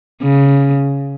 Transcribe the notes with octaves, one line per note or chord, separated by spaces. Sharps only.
C#3